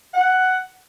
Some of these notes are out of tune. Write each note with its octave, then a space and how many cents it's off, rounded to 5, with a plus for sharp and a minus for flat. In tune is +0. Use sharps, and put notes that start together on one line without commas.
F#5 +5